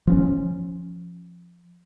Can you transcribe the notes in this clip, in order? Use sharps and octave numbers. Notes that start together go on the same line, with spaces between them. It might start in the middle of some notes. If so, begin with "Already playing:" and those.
F3 C4 C#4